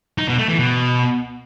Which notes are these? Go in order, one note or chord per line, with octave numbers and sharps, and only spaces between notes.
D#4
B2
A3
E3
B2